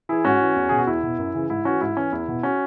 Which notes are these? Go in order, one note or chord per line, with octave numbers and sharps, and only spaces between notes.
E3 E4 G#4
G#2 C#4 F#4
E3
E2
B2 G#4
F#4
E2 E4
B2
F#2
C#3 E3
G#2 E4
E3 C#4 F#4
G#2 E4
E3 C#4
E2 E4
B2
C#4 F#4